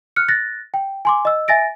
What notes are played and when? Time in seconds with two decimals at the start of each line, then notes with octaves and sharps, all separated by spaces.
0.16 F6 F#6 C#7
0.28 F#6 A6 A#6
0.74 G5
1.05 G#5 C6 D6
1.25 D#5 E6
1.48 E5 G#5 A6 A#6 D7